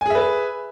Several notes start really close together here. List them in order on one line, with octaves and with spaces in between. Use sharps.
G#5 G#4 E5 B4